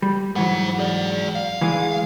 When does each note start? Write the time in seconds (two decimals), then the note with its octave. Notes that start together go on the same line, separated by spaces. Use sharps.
0.02 G3
0.36 G#2 E3 F#3 C5 F#5
0.79 G#4 D5
1.35 F5
1.61 E3 G#3 G#4